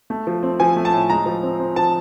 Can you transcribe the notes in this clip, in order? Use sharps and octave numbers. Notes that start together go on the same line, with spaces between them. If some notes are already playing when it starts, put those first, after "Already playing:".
A3
F3
C4
F3 G#5
A3
A5
A2
G#3 A#5
F3
C4
C4
F3 A5